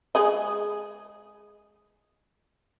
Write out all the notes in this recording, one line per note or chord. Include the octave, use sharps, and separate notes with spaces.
G#3 G#4 D#5